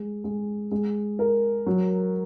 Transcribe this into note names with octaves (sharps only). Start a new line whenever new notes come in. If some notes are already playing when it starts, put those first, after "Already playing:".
Already playing: G#3
G#3
G#3
A#4
F#3